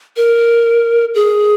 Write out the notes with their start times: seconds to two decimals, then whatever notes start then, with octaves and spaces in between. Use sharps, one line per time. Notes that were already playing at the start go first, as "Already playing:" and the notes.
0.17 A#4
1.15 G#4